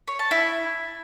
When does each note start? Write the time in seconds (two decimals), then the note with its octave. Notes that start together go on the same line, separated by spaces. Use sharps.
0.08 C#5
0.19 A5
0.31 E4